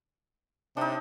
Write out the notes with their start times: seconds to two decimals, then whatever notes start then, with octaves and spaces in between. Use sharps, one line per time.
0.77 C3 D4 D#4